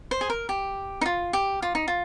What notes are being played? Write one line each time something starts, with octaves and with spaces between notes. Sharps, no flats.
C5
G#4
A#4
G4
D#4
F4
G4
F4
D#4
F4